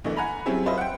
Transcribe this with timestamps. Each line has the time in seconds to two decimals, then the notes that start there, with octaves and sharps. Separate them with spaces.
0.04 A#1 B2 D3 E3 A3
0.16 F#5 G#5 A#5 B5
0.46 F#3 G3 C4 C#4 E4 G#4
0.66 F4 B4 C5 D#5 E5
0.78 F#5 G5